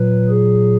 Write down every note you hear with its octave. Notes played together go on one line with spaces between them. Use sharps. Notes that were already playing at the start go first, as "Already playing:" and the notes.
Already playing: A#2 F#3 B4
G#4